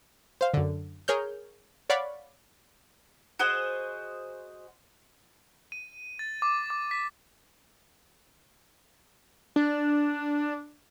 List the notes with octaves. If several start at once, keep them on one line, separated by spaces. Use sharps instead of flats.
C5 F5
F#2 D3
G#4 A#4 C#5 F6 G6
C#5 D5 F5 F#5 B5 C#6
F#4 G#4 C5 D#5
D#7
A6
D6
D6
B6
D4